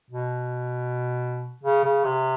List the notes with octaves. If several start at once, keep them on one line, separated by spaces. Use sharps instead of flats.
B2
C#3
C#3
C3